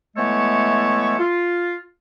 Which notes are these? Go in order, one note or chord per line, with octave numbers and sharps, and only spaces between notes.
E3 G#3 A3 B3 A4 C#5
F4